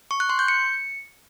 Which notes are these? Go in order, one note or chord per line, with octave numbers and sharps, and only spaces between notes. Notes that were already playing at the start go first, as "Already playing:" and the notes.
C#6
F#6
C6
G6
C#7